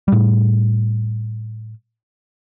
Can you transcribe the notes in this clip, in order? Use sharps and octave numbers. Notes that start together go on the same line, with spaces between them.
A2 G3